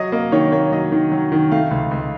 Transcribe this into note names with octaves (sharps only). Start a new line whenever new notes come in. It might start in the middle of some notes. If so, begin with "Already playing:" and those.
Already playing: F#3 D#5
A#3 D#5
D#3 C#5
A#3 C#5
F#3 D#5
D#3
F#3
D#3
A3 F5
C#2
C#2